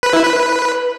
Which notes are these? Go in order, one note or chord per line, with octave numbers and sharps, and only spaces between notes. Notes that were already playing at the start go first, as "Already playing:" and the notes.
B4
E4
B4